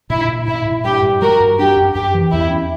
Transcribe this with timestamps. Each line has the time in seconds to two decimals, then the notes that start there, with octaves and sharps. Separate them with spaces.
0.10 A#2 E4
0.28 A#2
0.47 A#2 E4
0.65 A#2
0.84 G2 G4
1.02 G2
1.21 G3 F#4 A#4
1.40 G2
1.59 D4 G4
1.76 F#2
1.95 F#2 G4
2.14 E3
2.32 E2 E4
2.51 C#4